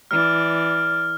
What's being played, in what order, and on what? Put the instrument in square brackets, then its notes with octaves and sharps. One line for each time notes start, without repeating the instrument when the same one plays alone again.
[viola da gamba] E3 D5 [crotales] F6